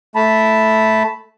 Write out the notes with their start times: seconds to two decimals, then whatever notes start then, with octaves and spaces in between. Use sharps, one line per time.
0.16 A3 A5 B5